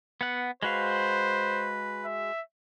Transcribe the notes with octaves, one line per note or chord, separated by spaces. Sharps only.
B3 F#5
G#3 F#4 B4 C5 F5
E5